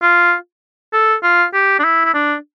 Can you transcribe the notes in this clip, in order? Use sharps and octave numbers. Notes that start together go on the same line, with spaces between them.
F4
A4
F4
G4
D4
E4
E4
D4